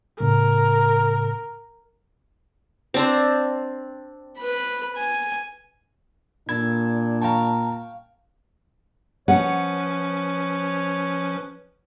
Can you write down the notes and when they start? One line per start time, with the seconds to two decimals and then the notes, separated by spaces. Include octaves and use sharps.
0.20 A2 C#3 A#4
2.94 C4 D4 C5
4.38 B4 B5
4.96 G#5
6.49 A#2 D4 A4 B5 G#6
7.22 F5 G5 A5 A#5 C#6
9.28 F3 C#4 B4 C#5 F#5